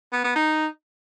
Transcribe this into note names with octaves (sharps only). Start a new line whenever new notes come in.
B3
B3
D#4